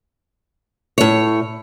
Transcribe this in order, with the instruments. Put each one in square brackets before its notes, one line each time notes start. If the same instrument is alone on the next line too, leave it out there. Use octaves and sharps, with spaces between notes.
[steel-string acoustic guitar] A2 C#5